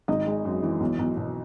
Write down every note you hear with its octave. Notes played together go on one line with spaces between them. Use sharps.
G#1 D#4 D#5
G#3
F#2
E3
B1
B1
B2